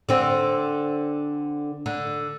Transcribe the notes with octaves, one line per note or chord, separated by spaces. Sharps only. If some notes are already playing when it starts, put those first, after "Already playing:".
D3 C4
D3